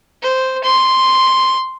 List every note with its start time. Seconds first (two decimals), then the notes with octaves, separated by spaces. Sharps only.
0.22 C5
0.64 C6